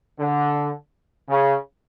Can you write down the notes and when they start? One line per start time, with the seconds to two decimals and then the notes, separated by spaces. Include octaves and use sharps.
0.19 D3
1.29 C#3